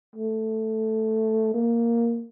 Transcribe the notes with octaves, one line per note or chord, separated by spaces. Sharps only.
A3
A#3